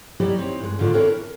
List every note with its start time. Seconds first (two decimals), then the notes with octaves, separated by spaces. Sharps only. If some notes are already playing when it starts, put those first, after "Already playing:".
0.20 F#3 G3 E4 G4 D5 D#5
0.38 C4 D#4 C#5
0.59 G2 G#3
0.79 G#2 D3 D#3 F4 D5
0.93 C4 D4 E4 A4 A#4 C#5
1.15 A#4